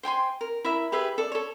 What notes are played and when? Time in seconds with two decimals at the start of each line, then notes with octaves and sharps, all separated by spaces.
0.03 C5 G5 G#5 C6
0.41 A#4
0.65 E4 A#4 E5 B5
0.92 G4 G#4 B4 E5
1.18 A4 D5
1.32 A4 C#5